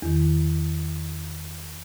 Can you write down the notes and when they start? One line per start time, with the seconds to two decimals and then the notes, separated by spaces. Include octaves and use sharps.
0.02 E2 D#3